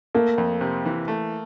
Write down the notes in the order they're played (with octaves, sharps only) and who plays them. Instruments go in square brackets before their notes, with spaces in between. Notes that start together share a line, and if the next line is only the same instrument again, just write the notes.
[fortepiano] A3 [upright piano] A#3
[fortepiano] F2
C3
E3
A3